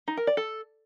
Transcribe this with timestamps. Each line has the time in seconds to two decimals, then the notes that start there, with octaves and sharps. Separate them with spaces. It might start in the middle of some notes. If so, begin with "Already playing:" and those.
0.08 D#4
0.17 A#4
0.27 D5
0.37 A4